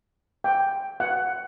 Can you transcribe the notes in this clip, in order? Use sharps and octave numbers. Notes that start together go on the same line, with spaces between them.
G5
F#5